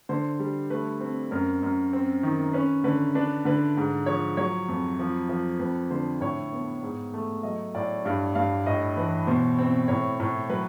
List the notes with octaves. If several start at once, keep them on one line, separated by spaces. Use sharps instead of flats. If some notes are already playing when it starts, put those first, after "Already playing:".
D3 C5
G3
A3 B4
C4
F#2 A#4
F#2
C4
D#3
C#4 B4
D3 B4
D4 B4
D3 B4
G#2
F3 C#5
F#3 C#5
F2
F3
F3
F2 B4
D3 C5
A2 C#5
B3
G#2
A3
F#3 D#5
A2 D5
G2 F5
G2 F5
A2 D#5
E3 B4
B2 C5
C4
A2 C#5
A2
F#3 B4